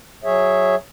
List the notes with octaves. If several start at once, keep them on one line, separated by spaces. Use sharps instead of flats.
F#3 G#4 C#5 E5